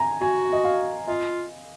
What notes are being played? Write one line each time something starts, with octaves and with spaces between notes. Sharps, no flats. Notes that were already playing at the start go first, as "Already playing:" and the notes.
Already playing: G#5 A#5
F#4 G#5
D#5
F5
F4 D#5